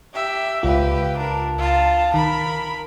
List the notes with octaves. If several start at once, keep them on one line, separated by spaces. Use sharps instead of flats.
G4 E5
C#2 F4 G4 B4
D4 A#4
F4 A5
D#3 A#4 B5